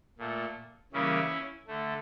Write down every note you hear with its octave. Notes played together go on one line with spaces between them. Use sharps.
A#2 A3
C#3 E3 G3 A#3 C#4 E4
D3 A3